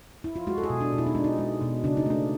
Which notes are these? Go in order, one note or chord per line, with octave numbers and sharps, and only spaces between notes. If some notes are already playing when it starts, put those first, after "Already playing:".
E4
F4
G#3 F#4
A4
G#4
B2
D4
B2
E4
D#4
G#3 D4
D#4
G#3
B2
C#3 D4
D#4
A3 D4